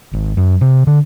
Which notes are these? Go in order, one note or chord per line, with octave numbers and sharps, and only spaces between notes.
G#1
F#2
C3
D3